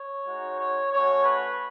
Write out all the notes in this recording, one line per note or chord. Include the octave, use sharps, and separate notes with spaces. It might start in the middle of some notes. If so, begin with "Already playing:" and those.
Already playing: C#5
G#3 D#4 F#4
C#5
A3 C#4 F#4 C#5
B4